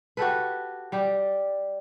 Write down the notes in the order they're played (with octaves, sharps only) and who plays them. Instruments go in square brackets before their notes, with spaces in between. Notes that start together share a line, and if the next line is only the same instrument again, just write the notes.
[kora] F#4 G4 A4 B4
G3 G4